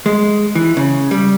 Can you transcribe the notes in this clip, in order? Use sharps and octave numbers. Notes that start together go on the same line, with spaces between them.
G#3
E3
C#3
G3